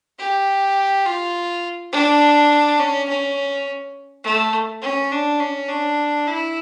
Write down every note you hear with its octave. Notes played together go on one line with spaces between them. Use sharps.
G4
F4
D4
C#4
C#4
A3
C#4
D4
C#4
D4
E4